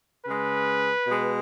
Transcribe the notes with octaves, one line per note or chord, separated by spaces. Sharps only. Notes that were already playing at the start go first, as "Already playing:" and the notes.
C#3 G#3 B4
B2
G#3